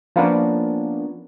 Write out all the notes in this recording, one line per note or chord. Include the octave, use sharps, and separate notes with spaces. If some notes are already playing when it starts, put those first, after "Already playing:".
F3 A#3 B3 C#4 D4